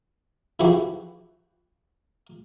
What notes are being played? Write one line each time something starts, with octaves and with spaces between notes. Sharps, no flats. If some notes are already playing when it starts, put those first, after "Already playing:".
C#3 E3 F3 E4 F#4 G4